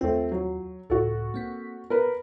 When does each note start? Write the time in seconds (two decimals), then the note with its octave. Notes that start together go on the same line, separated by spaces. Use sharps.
0.01 D#2 A3 C4 F4
0.31 F#3
0.90 C#2 A2 F#4 A4
1.34 A#3 C4 B6
1.90 B3 A#4 B4